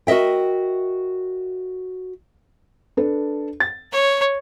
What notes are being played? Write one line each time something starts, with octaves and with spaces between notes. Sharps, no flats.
F#4 A#4 D#5 E5 G5
D4 A4 B4
A6
C#5